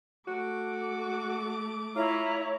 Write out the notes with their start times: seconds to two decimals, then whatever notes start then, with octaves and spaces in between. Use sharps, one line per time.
0.28 A3 F#4 D6
1.96 E4 F4 C#5 E5 A#5